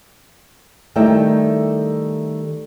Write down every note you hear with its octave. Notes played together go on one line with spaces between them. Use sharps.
D#3 G3 A3 E4 E5 G5